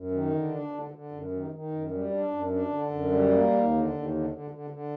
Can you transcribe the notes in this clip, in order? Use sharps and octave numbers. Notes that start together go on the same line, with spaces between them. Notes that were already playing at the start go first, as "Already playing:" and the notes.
Already playing: F#2
D#3
D3
D4
D3
D3
F#2
D#3
D#3
F#2
G3
D4
F#2
D4
D3
F#2
G3
A#3
D#2
D3
D#2
D3
D3
D3
D3